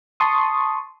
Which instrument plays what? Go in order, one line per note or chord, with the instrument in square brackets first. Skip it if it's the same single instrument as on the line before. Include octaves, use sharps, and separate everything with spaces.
[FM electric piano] A5 C6 C#6 D#6